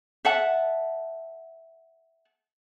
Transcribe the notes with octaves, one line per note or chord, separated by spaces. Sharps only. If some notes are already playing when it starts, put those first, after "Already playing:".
E5 F#5 A5